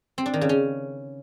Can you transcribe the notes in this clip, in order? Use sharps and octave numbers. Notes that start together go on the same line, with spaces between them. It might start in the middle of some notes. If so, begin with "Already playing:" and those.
C4
D4
D#3
C#3
C#4